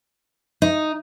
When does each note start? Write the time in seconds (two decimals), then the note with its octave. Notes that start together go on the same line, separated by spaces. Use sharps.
0.62 D#4